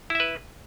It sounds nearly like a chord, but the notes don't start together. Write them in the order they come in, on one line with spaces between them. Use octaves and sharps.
E4 E5 B4